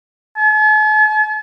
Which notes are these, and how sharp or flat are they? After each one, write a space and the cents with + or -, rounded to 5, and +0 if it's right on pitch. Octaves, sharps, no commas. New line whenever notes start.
A5 -45